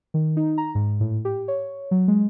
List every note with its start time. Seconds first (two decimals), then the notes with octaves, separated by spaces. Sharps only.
0.14 D#3
0.37 D#4
0.58 A#5
0.75 G#2
1.00 A2
1.25 G4
1.48 C#5
1.91 F#3
2.08 G#3